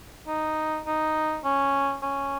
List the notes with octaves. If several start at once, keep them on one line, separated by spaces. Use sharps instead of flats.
D#4
D#4
C#4
C#4